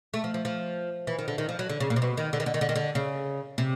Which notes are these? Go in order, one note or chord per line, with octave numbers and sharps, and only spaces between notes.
A3
F3
F3
F3
E3
D#3
D3
D#3
F3
F#3
D3
C#3
A#2
C3
B2
D#3
D3
D#3
D3
D#3
D3
D#3
D3
C#3
C3